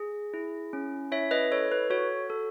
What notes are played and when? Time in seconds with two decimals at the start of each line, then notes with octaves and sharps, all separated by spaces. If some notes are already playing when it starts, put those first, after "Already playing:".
Already playing: G#4
0.34 E4
0.73 C#4
1.12 E4 C#5 E5
1.31 B4 D#5
1.51 A4 C#5
1.72 B4
1.90 F#4 C#5
2.30 A4